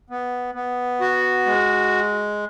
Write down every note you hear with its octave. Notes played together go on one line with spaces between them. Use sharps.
B3
B3
F#4
G#3